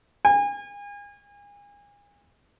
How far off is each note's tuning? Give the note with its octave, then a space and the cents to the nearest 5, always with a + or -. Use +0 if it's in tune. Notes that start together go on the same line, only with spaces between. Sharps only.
G#5 -35